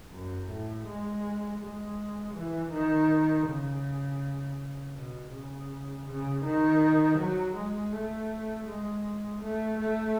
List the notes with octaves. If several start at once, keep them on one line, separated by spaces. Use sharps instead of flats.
F#2
A2
G#3
G#3
E3
D#3
C#3
B2
C#3
C#3
D#3
F#3
G#3
A3
G#3
A3
A3